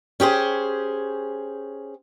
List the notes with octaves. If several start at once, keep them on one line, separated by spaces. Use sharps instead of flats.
C#4 G4 G#4 C5